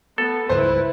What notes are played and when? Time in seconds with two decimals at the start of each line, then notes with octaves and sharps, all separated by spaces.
0.18 B3 A4
0.49 C#2 G2 E4 B4 C5